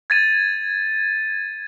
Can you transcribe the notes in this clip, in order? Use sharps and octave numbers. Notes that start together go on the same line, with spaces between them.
G#6 A6 D#7